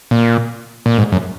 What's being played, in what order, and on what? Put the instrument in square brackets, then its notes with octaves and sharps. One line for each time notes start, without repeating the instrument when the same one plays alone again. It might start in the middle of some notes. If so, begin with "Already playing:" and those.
[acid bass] A#2
A#2
G#2
F#2